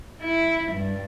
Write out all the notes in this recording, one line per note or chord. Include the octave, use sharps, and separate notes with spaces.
E4
G2